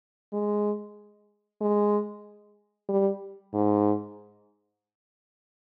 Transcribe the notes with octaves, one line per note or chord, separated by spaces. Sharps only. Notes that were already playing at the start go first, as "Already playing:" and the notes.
G#3
G#3
G3
G#2